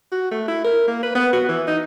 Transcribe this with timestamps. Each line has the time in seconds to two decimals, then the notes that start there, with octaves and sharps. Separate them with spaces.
0.12 F#4
0.32 A3
0.48 E4
0.65 A#4
0.88 A#3
1.03 B4
1.15 B3
1.33 F#4
1.49 E3
1.68 D#4